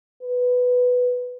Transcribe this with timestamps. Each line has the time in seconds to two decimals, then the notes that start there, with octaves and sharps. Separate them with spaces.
0.23 B4